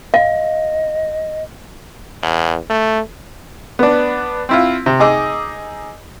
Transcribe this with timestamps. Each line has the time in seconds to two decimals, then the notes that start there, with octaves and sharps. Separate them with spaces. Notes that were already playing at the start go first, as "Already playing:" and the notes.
0.14 D#5 F5
2.23 E2
2.70 A3
3.79 B3 D4
4.49 C4 E4 F4
4.86 C3
5.00 D#4 G#4 D#5 D6 E6